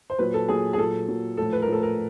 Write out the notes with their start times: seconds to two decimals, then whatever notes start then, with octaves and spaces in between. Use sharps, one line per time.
0.10 C5
0.19 A#2 F#3 B4
0.34 A4
0.48 A#2 F#3 G#4
0.73 G#4
0.78 A#2 F#3 A4
1.08 A#2 F#3
1.37 A2 F3 A4
1.53 B4
1.62 A#4
1.67 A2 F3
1.72 A4
1.83 A#4